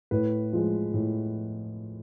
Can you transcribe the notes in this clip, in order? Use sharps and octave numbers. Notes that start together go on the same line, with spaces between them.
A2 B4
F3 G#3
A2